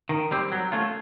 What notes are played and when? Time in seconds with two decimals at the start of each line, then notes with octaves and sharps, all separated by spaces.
0.09 D#3
0.31 G3 C4
0.52 F#3
0.72 A3 C#4 F4